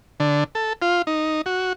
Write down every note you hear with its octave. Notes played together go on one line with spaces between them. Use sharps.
D3
A4
F4
D#4
F#4